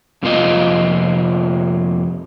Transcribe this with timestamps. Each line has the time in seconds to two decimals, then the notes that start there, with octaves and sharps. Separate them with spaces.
0.23 F2 C3 F3 A#3 F4 D#5